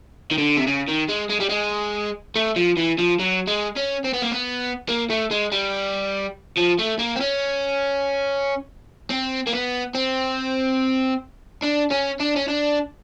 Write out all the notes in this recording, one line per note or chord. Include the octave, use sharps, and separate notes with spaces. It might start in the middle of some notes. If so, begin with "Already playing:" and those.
D#3
D3
C3
C#3
D#3
G#3
G#3
G3
G#3
A3
F3
E3
F3
F#3
G#3
C#4
C4
B3
A#3
B3
A#3
A3
G#3
G3
F3
A3
A#3
C4
C#4
C4
A#3
B3
C4
D4
C#4
D4
C#4
D4